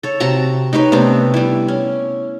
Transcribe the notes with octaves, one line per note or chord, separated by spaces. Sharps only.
A4 C#5
C3 F#4 A5 A#5
D#4 G4 B4 C#5
C3 A3 B3 D4
G3 E4
C#4